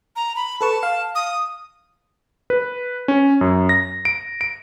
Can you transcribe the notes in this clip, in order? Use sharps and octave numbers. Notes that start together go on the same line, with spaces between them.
A#5
B5
A4 B4 A5 C#6
F5
D#6
B4
C#4
F#2
A#6
D7
D7